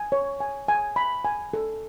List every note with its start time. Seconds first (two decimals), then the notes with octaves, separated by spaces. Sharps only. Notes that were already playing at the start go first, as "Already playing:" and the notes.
Already playing: G#5
0.12 C#5
0.40 G#5
0.68 G#5
0.96 B5
1.25 G#5
1.54 A4